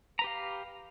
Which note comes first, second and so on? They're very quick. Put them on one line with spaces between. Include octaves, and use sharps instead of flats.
A#5 B4 G4 F5